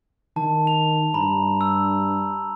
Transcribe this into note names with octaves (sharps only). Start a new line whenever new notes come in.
D#3 A5
F7
G2 A#5 B5
E6